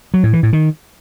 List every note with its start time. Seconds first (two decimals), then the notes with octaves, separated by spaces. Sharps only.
0.14 F#3
0.23 A2
0.33 E3
0.43 A2
0.53 D#3